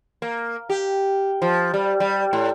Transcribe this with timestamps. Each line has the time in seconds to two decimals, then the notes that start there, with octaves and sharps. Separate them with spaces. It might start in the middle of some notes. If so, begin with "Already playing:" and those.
0.22 A#3
0.69 G4
1.42 F3
1.74 G3
2.00 G3
2.33 A2